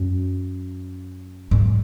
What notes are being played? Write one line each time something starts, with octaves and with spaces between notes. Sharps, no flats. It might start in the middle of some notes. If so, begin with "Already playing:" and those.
Already playing: F#2
G#2